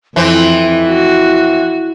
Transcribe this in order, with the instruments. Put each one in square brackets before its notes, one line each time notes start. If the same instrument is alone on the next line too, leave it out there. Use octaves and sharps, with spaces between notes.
[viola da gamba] F2 [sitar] E3 C4 [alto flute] E4
[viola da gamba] F#4